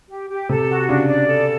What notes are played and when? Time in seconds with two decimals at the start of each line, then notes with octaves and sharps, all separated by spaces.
0.10 G4
0.30 G4
0.49 C3 A4
0.69 F#4
0.89 C#3 D4
1.08 D5
1.28 A4